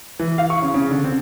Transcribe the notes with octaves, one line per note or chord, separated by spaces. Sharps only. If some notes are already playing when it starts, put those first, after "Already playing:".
E3
F5
C#6
C#3
C#3
D3
C4